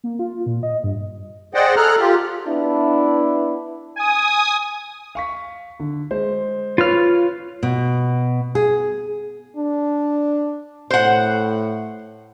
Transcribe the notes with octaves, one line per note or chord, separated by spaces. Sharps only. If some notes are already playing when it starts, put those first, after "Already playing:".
A#3
F4
A#2
D#5
G2
G#4 C5 D5 D#5 F#5 G5
G#4 A4 A#5 F6 F#6
F4 G4
B3 D4 E4
G#5 D#6
F5 C#6 B6
D3
G#3 C5
F4 B4 C#5 F5 F6
B2
G#4
D4
A2 C5 F#5